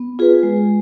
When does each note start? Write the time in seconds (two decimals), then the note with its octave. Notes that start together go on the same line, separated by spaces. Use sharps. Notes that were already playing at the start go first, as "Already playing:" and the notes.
Already playing: B3
0.19 F4 G#4 B4
0.43 G#3